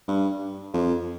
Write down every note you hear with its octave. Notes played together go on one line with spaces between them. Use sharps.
G2
F2